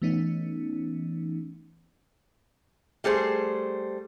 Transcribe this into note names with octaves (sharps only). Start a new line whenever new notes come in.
E3 A3 B3 C#4 D#4
G3 A3 G#4 C5